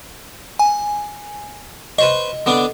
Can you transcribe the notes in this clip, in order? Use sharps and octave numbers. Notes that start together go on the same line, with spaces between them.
G#5
B4 C5 D#5 C#6
D3 B3 D4